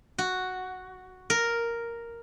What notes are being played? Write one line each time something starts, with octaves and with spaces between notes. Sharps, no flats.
F#4
A#4